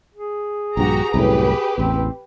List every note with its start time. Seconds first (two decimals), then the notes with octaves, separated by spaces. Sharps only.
0.14 G#4
0.77 A#1 G2 F#4 G4 A#5
1.14 C2 F#2 A2 G4 B4
1.78 A1 E2 C4